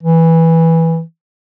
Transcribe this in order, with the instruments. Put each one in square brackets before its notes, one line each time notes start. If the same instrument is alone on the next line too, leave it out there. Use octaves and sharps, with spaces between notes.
[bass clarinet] E3